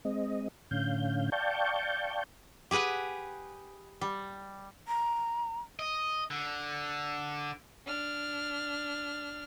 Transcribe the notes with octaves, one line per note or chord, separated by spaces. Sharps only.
G#3 C4 D#5
A2 D3 C#4 F5 G6
D5 F5 G5 A5 C#6 G6
G4 G#4 B4 F#5 G#5
G3
A#5
D#5
D3
D4 F6